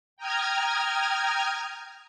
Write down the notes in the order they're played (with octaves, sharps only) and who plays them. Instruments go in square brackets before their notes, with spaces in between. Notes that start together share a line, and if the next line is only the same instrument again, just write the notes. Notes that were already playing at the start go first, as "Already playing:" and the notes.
[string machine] G5 A#5 D#6 F6 G#6